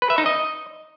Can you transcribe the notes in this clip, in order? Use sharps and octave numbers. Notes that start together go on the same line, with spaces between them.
B4
E5
D#4
D#5